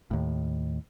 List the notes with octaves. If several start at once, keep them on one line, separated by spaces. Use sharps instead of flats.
D#2 A2